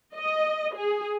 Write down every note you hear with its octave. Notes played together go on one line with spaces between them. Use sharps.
D#5
G#4